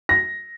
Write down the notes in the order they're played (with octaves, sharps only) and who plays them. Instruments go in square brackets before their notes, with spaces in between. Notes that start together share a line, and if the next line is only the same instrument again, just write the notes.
[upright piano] A#6